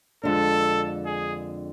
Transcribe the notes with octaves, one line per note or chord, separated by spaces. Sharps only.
F2 D3 G#3 D4 A4
G#4